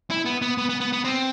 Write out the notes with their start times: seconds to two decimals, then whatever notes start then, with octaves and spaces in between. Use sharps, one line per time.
0.10 E4
0.25 B3
0.42 B3
0.58 B3
0.69 B3
0.81 B3
0.93 B3
1.05 C4